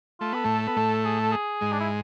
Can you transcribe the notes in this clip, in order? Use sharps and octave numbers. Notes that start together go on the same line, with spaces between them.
A3 F4
B3 A4
A2 A3
B3
A2 A3
G#4
A4
G#4
G#2 G#3
D4
E4